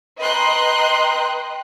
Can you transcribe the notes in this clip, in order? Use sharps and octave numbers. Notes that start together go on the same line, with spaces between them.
B4 D#5 G5 A#5 C6 F#6